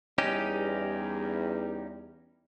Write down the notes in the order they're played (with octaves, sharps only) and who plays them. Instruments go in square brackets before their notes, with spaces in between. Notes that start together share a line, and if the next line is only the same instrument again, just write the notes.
[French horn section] E2 G3 [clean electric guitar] C#4 D#4 G4